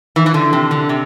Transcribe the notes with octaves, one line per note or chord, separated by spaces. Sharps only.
E3
E3
D3
C3
D3
C3